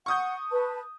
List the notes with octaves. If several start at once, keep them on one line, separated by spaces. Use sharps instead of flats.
F#5 C#6 D#6 G6
B4 A5